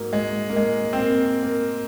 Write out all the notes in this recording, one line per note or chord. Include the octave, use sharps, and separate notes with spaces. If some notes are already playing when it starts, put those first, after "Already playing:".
Already playing: G#2 F#3 A#3
G#3
A#3
G#3
C4
A#3
A#3